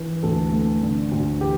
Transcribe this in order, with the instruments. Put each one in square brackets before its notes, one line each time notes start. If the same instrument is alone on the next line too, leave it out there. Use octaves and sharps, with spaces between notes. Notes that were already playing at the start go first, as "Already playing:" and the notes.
Already playing: [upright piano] E3
D2 A4
A3
D3
D2
E3 G4